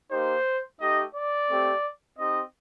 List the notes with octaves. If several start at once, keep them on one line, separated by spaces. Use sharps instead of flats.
A#3 D#4 G4 C5
A3 D#4 G4 D#5
D5
A3 C4 G4
C4 D#4 G4 D#5